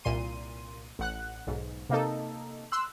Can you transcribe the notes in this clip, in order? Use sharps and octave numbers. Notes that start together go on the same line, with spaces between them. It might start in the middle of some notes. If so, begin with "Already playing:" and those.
C2 A#2 C6 D#7
A1 F#5 F#6
B1 G#2
C3 A#3 D#4 A4
C6 E6 F#6